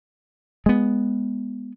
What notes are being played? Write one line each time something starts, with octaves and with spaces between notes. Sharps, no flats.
G#3 B3